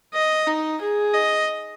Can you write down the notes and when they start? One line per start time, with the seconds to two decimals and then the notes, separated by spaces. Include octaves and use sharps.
0.14 D#5
0.47 D#4
0.81 G#4
1.14 D#5